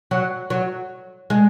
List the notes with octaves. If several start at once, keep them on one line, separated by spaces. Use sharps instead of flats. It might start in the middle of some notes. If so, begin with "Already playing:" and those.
F#3
F#3
G#3